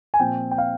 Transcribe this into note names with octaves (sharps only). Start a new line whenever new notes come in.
G#5
A#2 F3 C4 G5
G5
F5